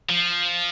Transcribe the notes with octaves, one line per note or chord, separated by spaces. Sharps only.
F3